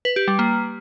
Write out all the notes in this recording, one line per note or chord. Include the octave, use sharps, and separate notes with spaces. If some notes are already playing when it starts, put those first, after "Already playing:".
B4
G4
G3
A#3